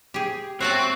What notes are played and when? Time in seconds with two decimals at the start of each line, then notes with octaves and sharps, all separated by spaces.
0.14 G4 G#4
0.61 C4 F#4 C#5 E5 A5 F#6 C7